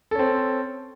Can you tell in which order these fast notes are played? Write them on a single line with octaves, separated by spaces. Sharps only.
A4 C#4 C4